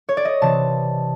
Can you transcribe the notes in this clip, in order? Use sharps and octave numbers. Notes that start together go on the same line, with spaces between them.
C#5
D5
D#5
C3 E3 A5